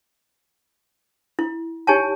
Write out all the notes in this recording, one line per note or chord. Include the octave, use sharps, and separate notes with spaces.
E4
D#4 G4 C#5 G#5 A5